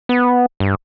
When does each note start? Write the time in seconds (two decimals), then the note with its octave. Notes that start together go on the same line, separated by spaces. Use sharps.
0.09 B3
0.60 G2